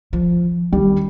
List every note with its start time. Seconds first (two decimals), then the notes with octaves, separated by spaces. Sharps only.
0.13 F3
0.72 D#3 G3